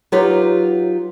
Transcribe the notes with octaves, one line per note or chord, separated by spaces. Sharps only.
F#3 D#4 F4 G4 B4